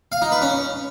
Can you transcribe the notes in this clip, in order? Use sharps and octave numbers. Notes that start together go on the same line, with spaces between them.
F5
D#4
B4
C#4